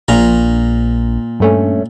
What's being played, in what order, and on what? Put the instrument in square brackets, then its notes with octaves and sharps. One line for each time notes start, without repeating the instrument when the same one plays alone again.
[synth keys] A#1 [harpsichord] A#2 A#5
[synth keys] G2 A3 C#4